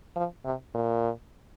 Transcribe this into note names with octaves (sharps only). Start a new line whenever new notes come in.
F3
C3
A#2